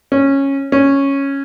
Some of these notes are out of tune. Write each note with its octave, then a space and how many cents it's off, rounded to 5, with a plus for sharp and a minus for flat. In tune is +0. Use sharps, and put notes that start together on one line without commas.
C#4 -10
C#4 -5